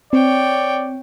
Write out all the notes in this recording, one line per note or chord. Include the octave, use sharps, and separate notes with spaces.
C4 C#5 D5 G5